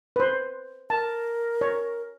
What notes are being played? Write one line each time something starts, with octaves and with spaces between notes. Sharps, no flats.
B4 C5
A#4 A5
C#5